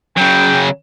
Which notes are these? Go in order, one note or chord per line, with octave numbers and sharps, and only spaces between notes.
C#3 F#3 G5